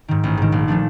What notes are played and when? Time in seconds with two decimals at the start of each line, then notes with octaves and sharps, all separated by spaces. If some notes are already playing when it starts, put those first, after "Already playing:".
0.08 G#2 D#3
0.23 A1
0.38 G#2 D#3
0.52 A#1
0.68 A#2 F3 A3 D4